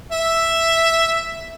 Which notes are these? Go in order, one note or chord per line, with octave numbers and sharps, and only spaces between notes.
E5